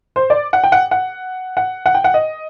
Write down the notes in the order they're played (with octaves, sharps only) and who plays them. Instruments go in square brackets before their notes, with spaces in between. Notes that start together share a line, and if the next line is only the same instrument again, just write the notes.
[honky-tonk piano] C5
D5
F#5
G5
F#5
F#5
F#5
F#5
G5
F#5
D#5